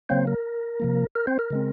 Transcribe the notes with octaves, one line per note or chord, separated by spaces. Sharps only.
C#3 F#3 A#3 C4 C5
A#4
C3 F3 A#3
A#4
C4 C5
A#4
C#3 G#3 C4